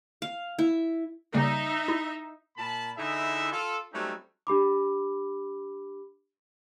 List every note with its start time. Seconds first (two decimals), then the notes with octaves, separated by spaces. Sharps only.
0.22 F5
0.59 E4
1.34 C#3 G3 A#3 D#4 E5
1.88 E4
2.57 A#2 A5 B5
2.97 D3 E3 D#4 E4 G#4 E5
3.52 F4 A4
3.93 F#3 G3 A3 C4 C#4 D#4
4.47 D4 G4 B5 D6